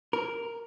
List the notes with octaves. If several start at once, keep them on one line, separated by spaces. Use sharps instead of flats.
A#4